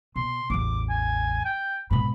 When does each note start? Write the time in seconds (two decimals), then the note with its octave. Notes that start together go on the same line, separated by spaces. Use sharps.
0.16 B2 C6
0.50 A1 E2 D6
0.89 G#5
1.45 G5
1.90 G#2 B2 B5